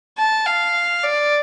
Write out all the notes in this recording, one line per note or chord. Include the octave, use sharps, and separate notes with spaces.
A5
F5
D5